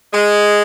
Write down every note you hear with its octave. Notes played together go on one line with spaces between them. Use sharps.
G#3